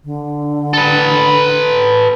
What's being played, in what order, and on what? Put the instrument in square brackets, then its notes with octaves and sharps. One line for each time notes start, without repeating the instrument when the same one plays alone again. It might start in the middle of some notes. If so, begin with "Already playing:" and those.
[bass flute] D3
[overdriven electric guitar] A4 B4